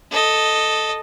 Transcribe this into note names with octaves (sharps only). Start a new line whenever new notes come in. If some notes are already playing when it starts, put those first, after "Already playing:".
A4 D#5